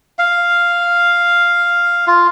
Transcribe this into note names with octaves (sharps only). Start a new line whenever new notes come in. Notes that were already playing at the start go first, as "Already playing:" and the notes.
F5
F4